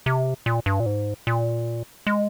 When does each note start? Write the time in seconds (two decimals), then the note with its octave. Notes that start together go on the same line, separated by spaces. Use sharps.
0.06 C3
0.46 A#2
0.66 G2
0.80 A#2
0.86 G#2
1.27 A#2
2.07 G#3